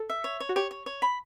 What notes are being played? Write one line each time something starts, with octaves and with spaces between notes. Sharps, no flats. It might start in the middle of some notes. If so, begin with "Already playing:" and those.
Already playing: A4
E5
C#5
C#5
F#4
G4 C#5
C#5
C#5
B5